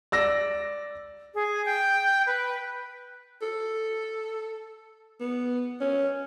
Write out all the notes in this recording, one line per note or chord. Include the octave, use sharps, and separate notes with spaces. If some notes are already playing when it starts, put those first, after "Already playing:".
D5 E6 A#6
G#4
G5
B4
A4
B3
C#4